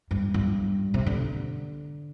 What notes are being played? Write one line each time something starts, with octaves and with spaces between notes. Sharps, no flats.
G2
G2
C3
D3